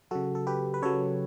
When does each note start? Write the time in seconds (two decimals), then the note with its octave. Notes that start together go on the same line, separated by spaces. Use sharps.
0.11 C#3 F#3 F#4 A4
0.35 A4
0.47 G4 B4
0.74 B4
0.82 C#3 F#3 A4 C#5